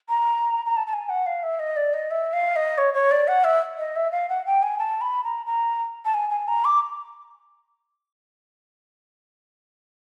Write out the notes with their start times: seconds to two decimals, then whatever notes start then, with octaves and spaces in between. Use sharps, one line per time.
0.09 A#5
0.66 A#5
0.77 A5
0.87 A5
0.93 G#5
1.09 F#5
1.26 F5
1.43 E5
1.59 D#5
1.76 D5
1.94 D#5
2.11 E5
2.33 F5
2.56 D#5
2.78 C#5
2.94 C#5
3.11 D5
3.28 F#5
3.44 E5
3.78 D#5
3.96 E5
4.12 F5
4.29 F#5
4.46 G5
4.63 G#5
4.79 A5
5.01 B5
5.24 A#5
5.46 A#5
6.05 A5
6.14 G#5
6.30 G#5
6.48 A#5
6.65 D6